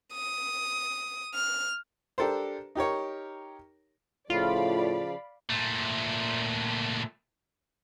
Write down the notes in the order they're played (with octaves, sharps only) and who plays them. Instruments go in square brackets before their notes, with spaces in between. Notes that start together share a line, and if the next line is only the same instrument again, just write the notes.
[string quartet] D#6
F6
[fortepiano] D4 G4 A4 A#4 C5
D#4 G4 A#4 C#5
[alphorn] A2 [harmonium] C#3 F3 [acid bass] F4 [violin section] D5 F5 B5
[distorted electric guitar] A#2 A3